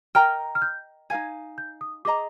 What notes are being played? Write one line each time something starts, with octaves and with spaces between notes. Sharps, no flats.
A#4 D#5 G5 A#5 F6
F6
G6
D#4 A#4 F5 G#5 G#6
G6
D#6
G#4 D#5 A#5 D6